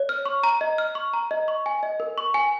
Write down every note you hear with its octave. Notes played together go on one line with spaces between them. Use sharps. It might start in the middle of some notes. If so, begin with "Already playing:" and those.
Already playing: C#5
F6
C#6
A#5
D#5
F6
C#6
A#5
D#5
C#6
G#5
D#5
A#4
C#6
G#5